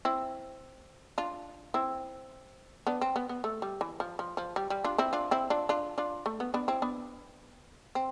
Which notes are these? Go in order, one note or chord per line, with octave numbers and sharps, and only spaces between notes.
C4 E4
D4 F4
C4 E4
B3 D4
C4
B3
B3
A3
G3
E3
F3
F3
F3
G3
G3
D4 F4
C4 E4
D4 F4
C4 E4
D4 F4
D4 F4
D4 F4
A3
B3
B3 D4
C4 E4
B3 D4
C4